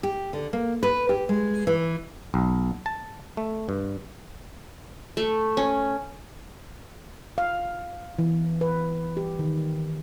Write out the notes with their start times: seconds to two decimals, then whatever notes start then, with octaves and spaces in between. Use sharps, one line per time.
0.03 G4
0.33 D3
0.53 A#3
0.83 B4
1.09 G4
1.29 G#3
1.67 E3
2.34 B1
2.86 A5
3.37 A3
3.69 G2
5.17 A3
5.57 C#4
7.38 F5
8.19 E3
8.61 B4
9.17 G4
9.39 D#3